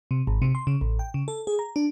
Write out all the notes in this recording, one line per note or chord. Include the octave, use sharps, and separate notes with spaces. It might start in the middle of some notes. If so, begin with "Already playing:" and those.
C3
G#1
C3
C6
C#3
A1
G5
C#3
A4
G#4
A#5
D4